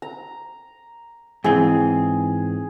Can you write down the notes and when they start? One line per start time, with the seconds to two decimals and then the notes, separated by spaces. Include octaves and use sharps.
0.02 A#5
1.44 G#2 E3 C4 G#4